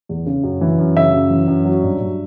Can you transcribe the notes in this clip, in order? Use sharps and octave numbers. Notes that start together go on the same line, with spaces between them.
E2
C#3
F#2
E3
F#2
C#3 E5
F#2
E3
F#2
F#3
G2
G2